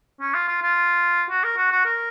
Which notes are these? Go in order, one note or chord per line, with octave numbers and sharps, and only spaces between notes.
C#4
F4
F4
F4
F#4
A#4
F#4
F#4
A#4